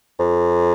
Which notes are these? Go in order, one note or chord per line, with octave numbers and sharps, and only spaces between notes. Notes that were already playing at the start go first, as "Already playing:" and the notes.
F2